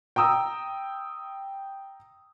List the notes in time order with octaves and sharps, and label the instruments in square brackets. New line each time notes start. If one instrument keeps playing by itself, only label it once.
[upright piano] G5 A#5 D#6 E6